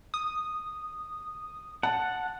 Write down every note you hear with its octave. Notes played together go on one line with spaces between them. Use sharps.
D#6
F#5 A5